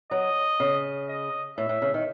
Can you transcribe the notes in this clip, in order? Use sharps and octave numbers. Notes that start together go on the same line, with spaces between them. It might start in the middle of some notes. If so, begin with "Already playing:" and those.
F#3 D#5
C#3
D#5
A2 E5
A2
C#3
D#3